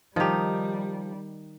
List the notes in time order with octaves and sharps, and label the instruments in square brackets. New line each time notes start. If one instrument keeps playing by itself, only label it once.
[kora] D#3 D#4 [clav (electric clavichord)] F3 G4 [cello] G3